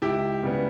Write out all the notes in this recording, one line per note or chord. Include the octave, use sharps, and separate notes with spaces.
C#2 E4 G4
C#3 G3 B3